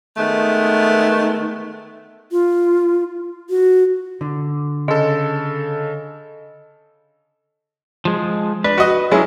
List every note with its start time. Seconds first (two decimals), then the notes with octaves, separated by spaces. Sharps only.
0.17 D#3 G#3 A3 B3
2.31 F4
3.50 F#4
4.21 D3
4.88 C#3 A4 D#5
8.05 F3 G#3
8.64 D4 B4
8.78 F#4 D#5
9.12 F#3 G#3 C#4 E4